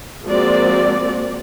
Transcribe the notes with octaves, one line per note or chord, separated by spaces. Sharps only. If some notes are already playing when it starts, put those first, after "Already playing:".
F3 G#3 A#3 C4 F#4 D5